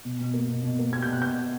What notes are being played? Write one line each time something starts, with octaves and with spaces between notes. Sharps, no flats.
B2
B2
A#3
B2
B2
A#3
A#3 G#6
B2 G6
F#6
B2 G6